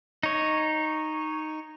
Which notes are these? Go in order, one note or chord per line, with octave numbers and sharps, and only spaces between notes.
D#4 C#5